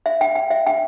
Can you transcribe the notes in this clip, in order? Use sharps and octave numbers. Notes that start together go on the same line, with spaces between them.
E5
G5
G5
E5
G5